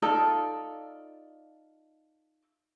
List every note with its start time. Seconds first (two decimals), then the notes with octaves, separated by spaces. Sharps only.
0.02 D#4 F4 A4 D5